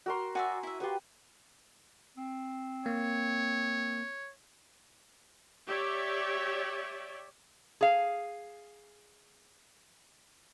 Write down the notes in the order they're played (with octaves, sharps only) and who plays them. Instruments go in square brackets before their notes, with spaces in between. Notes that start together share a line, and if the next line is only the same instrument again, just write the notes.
[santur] F#4 A#4 C6
[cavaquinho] F#4 D5 E5 [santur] G#5
[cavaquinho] E4 E5
[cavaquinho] F4 C#6 [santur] G4 B4 F#5
[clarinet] C4
[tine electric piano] A#3 [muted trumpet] C#5
[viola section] G4 C#5 D5 E5
[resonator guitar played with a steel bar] G#4 F5